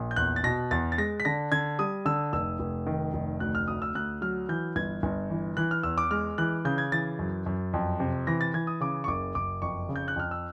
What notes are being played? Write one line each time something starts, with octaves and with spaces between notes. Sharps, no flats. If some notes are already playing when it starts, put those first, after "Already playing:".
Already playing: A#1
G6
E2 F#6
A6
B2 A#6
E2 A6
A6
G#3 A#6
B6
D3 A#6
D3 G#6
G3 D#6
D3 E6
F1 E6
F1
D#3
F1
D2 F#6
F6
D2 D#6
E6
D2 F#6
F#3 F6
E3 G6
G1 G#6
G1
E3
E3 F#6
F6
E2 E6
D6
G#3 F6
E3 F#6
C#3 G6
G#6
E3 A6
F#2
F#2
F2
C3
E3 A#6
A6
E3 G#6
D#6
C#3 D6
C#6
F#1 D6
F#1 D6
F2 C#6
C#3
G6
F#6
F2 F6
E6